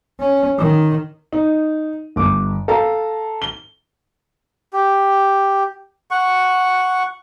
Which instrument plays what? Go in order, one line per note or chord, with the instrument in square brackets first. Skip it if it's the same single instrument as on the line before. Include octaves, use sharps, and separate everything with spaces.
[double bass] C#4
D#3
[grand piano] D#4
G1 D6
A4 F5 A#5
G7
[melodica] G4
F#5 C#6